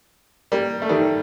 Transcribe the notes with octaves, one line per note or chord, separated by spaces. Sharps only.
G3 A#3
A3
D#3 G3